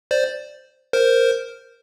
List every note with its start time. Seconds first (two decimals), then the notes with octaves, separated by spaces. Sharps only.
0.11 C5 D5
0.93 A#4 C5